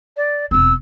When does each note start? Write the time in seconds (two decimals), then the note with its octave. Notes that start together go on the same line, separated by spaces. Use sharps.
0.17 D5
0.51 E1 C4 E6